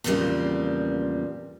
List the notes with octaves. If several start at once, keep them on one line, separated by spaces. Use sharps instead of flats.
E2 A#2 C#3 F3 G3 C4